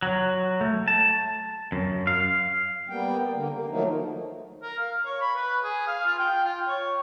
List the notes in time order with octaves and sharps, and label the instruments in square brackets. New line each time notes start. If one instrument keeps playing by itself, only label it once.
[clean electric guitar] F#3
A3
A5
F#2
F5
[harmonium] G3 A#3 B3 G5
D3 A#3
A#3
D#3 F3 F#3 A3 A#3 D#4
[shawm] A#4
F5
C#5
B5
B4
G#4
F5
F4
G5
F4
C#5